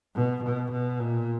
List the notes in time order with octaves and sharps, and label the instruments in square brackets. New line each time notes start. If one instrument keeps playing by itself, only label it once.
[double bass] B2
B2
B2
A#2